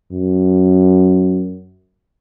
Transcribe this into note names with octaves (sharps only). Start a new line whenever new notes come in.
F#2